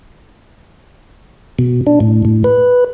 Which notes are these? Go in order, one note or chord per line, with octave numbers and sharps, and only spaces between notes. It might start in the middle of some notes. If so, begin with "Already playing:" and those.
B2
D4
A2
A2
B4